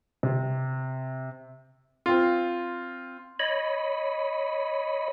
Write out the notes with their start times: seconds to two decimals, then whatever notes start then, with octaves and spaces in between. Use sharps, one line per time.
0.23 C3
2.06 C4 F4
3.40 C#5 D#5 B5